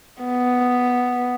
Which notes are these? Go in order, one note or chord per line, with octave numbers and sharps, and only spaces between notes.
B3